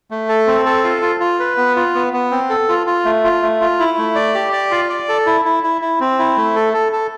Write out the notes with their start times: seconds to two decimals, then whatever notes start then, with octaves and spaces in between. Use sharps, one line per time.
0.11 A3
0.29 A4
0.47 C4
0.66 A4
0.84 F4
1.02 F4
1.20 F4
1.39 B4
1.57 B3
1.76 F4
1.94 B3
2.13 B3
2.31 C4
2.50 A4
2.69 F4
2.87 F4
3.05 A3
3.24 F4
3.42 A3
3.61 F4
3.79 E4
3.98 A3
4.15 D5
4.35 G4
4.53 D5
4.71 F4
4.89 D5
5.09 A4
5.27 E4
5.45 E4
5.63 E4
5.81 E4
6.00 C4
6.19 E4
6.37 A3
6.56 A4
6.73 A4
6.92 A4